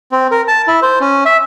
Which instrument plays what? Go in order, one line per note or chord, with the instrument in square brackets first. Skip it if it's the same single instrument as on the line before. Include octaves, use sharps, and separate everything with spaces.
[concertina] C4
A#4
A5
E4
C5
C#4
E5